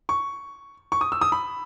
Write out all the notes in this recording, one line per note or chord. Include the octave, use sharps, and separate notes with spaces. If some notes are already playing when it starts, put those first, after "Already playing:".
C#6
C#6
D#6
E6
D#6
B5